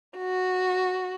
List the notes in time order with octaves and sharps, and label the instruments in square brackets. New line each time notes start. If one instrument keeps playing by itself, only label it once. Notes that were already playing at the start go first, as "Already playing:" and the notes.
[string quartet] F#4